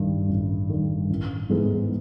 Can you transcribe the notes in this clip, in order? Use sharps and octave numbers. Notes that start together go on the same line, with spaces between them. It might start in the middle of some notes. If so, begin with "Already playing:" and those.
Already playing: A1 G2 D#3
A1
G2 D#3
A1
G#2 E3 G#3 B3